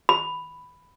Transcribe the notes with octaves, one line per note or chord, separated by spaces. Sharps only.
B5